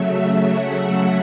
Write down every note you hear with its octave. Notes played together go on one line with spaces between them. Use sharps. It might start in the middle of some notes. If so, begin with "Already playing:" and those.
Already playing: C#3 F#3 A3 E5
F#5